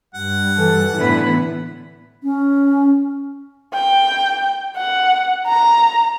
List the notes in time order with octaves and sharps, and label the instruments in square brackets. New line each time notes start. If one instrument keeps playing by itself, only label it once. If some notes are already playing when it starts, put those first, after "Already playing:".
[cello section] G2 [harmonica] F#5
[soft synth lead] E3 [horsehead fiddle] A4
[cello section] A2 D3 B3 [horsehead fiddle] E4 B4
[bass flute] C#4
[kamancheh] G5
F#5
A#5